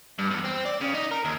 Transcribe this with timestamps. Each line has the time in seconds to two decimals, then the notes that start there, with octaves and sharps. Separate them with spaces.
0.19 G2
0.31 E2
0.44 C4
0.65 D5
0.81 C#3
0.94 D#4
1.12 A#4
1.25 D#2